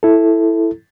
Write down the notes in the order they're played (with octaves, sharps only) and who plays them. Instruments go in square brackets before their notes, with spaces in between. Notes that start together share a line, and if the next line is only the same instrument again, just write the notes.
[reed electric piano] E4 A4